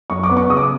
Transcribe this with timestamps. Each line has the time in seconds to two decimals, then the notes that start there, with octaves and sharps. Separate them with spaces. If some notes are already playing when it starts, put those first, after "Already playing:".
0.10 F#2 C#6
0.23 D6
0.29 B3
0.37 C#6
0.50 C#3 D#6
0.57 D6